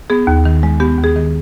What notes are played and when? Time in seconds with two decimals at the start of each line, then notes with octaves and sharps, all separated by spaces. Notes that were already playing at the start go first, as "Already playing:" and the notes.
0.10 B3 G#4
0.27 D#2
0.45 D#3
0.63 G#3
0.80 B3 G4
0.98 D#2
1.04 G#4
1.16 D#3